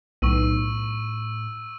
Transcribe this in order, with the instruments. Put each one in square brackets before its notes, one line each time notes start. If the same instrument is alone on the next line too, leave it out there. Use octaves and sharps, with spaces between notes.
[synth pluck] B1 [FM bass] A2 [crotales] C#6 E6 D#7